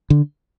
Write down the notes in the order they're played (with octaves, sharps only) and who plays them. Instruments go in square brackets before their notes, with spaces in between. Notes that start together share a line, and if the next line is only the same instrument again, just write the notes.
[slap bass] D3